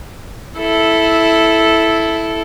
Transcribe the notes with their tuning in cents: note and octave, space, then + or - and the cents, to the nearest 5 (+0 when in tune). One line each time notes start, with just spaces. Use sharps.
E4 +0 A4 -10